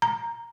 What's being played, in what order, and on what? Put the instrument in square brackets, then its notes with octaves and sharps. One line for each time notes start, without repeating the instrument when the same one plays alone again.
[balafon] A#5